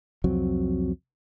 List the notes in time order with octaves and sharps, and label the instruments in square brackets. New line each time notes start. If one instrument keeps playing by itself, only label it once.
[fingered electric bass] C2 F2 F#3 C4